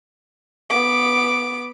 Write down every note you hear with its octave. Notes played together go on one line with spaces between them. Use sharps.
B3 D6